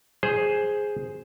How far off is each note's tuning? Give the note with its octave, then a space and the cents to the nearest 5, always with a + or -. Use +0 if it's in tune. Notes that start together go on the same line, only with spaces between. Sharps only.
G#4 +0 C5 +0